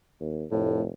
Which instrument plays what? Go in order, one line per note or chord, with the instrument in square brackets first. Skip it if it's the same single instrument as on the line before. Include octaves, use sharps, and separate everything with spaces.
[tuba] D#2
[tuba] F1 [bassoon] A2